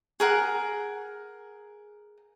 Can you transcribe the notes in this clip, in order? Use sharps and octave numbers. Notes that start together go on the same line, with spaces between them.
G#4 A#4 F#5